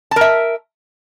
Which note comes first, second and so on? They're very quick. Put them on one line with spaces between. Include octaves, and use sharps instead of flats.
A5 A#4 E5